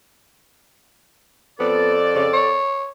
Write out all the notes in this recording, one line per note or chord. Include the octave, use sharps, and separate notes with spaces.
F2 B3 A4 D5
C#3
C#5